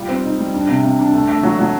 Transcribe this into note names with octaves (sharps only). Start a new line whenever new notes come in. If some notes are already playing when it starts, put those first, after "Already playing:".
Already playing: G3 F4
C4
D#4
G3
D4
C3
C3
D4
A3
A3
F#3
F#3